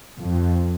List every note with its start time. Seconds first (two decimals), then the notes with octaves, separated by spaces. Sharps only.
0.17 F2